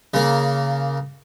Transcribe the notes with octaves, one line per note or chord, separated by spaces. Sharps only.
C#3 A#3